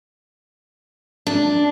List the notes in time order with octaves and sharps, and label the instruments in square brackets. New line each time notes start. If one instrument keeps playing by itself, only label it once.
[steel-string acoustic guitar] D4